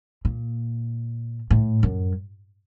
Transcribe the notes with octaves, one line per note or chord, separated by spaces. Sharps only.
A#2
A2
F#2